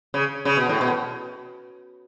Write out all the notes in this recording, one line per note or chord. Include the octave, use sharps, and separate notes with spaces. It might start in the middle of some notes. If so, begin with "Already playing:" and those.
C#3
C#3
B2
A2
B2